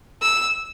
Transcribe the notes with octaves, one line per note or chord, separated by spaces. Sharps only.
E6